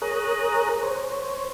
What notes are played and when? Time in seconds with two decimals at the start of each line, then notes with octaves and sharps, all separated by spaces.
0.02 G#4 A#4 C#5 A#5 D#6 F#6
0.83 C5 C#5